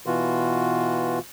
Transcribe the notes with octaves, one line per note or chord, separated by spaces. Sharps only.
B2 E3 F4 F#4